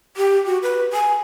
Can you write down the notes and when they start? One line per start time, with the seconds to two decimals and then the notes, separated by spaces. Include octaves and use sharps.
0.17 G4
0.46 F#4
0.63 B4
0.93 G#5